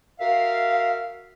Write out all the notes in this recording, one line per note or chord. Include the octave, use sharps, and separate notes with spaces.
F#4 A#4 E5 F5